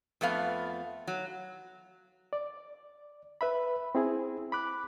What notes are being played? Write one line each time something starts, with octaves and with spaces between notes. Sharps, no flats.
F2 A3 B3 F5
F#3
D5
B4 E5 B5
C4 E4 G#4
B5 D6 F#6